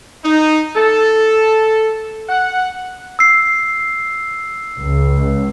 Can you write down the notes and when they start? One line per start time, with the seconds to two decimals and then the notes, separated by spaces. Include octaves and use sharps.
0.24 D#4
0.76 A4
2.29 F#5
3.19 E6 C7
4.79 C#2